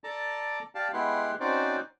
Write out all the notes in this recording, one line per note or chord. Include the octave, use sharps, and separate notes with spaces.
A4 D5 A5 A#5 D6
G4 D5 F5 A5
G#3 B3 E4 G4 F#5 C6
C4 C#4 D#4 F#4 C5 D5